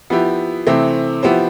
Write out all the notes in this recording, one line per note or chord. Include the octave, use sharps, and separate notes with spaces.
F3 B3 E4 G4
C3 E3 A3 C4
F3 B3 E4 G4 C5